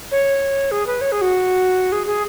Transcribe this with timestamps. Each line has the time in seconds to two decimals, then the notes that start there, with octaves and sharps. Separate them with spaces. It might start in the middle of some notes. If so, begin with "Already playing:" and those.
0.11 C#5
0.71 G#4
0.87 B4
1.01 C#5
1.12 G#4
1.21 F#4
1.92 G#4
2.07 G#4